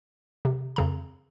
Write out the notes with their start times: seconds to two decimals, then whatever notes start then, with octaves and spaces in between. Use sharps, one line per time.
0.45 C3
0.76 F2 C#3 A#5